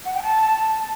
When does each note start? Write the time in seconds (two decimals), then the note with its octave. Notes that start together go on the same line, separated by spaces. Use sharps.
0.05 F#5
0.14 G5
0.23 A5